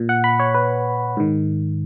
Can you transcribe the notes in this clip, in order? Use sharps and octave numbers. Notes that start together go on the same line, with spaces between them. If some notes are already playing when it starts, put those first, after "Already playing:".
Already playing: A#2
F#5
B5
C#5
B4
G#2 D#3